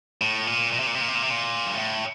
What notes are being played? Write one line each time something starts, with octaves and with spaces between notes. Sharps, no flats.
A2
A#2
A#2
C3
A#2
C3
A#2
C3
A#2
C3
A#2
G2
A2